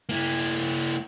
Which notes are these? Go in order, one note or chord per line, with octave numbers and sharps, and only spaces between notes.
A#3 E4